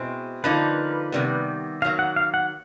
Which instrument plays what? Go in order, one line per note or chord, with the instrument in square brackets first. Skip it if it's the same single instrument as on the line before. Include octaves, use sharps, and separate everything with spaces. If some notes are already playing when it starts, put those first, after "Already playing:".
Already playing: [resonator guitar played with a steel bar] B2 G#3 C4 E4
[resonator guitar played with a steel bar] D3 F3 A#3 D#4 [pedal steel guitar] B4
[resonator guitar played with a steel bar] C3 D#3 G3 B3
[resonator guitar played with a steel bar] D#3 F#3 A#3 [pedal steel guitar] F5
[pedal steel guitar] F#5
F5
F#5